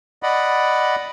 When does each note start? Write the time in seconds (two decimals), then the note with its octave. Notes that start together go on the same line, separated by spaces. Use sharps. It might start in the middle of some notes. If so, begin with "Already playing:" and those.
0.23 D5 D#5 F#5 B5